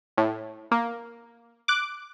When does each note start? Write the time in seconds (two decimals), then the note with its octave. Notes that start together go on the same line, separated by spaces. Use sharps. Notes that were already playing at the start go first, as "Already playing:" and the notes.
0.18 A2
0.71 A#3
1.68 D6 F#6